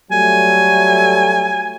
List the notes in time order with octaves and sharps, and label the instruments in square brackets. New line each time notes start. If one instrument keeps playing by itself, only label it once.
[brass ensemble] F#3 G3 A3 [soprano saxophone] G#5